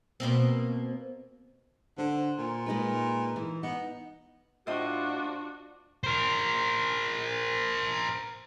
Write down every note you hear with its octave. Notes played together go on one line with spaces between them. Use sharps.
B2 A#3 C4
D3 C5
A#2
G#3 D#4 B4
E3
B3 D#4
A2 D4 F4 F#4 C5 D#5
A#4 C5